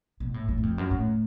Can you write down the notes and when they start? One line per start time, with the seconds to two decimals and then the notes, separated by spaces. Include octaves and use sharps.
0.20 B2
0.34 A2
0.48 A2
0.58 F#2
0.63 F2
0.78 F#2
0.91 A2